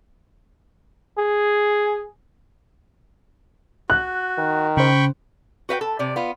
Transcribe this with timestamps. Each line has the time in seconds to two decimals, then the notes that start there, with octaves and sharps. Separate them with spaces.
1.18 G#4
3.90 F#4 F#6
4.38 D#3
4.77 C#3 C5 G5 B5 C#6
5.69 F#4 B4 F5 G5
5.81 A4
5.99 C3 D5
6.16 B3 F4